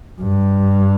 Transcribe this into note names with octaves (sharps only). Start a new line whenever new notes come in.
G2